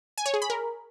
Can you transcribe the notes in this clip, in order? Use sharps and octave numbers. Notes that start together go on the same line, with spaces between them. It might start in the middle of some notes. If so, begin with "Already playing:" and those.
G#5
C#5
G#4
B5
A#4